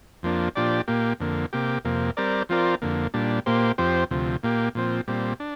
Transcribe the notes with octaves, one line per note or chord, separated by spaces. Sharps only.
F2 F3 A#3 D4
A#2 F3 D4 G4 D5
A#2 A#3 G4
F2 D3 A#3
C3 A#3 G4
F2 C3 A#3
G3 C4 A#4 D5
F3 C4 F4 A#4 D5
F2 D3 A#3
A#2 G3 D4
A#2 A#3 G4 C5
F2 F3 C4 G4 C5
D2 C3 F3
A#2 A#3 G4
A#2 F3 C4
A#2 G3 C4
D4